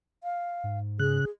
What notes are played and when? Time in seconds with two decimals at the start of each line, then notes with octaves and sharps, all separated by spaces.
0.24 F5
0.64 G#2
0.99 C#3 G#4 F#6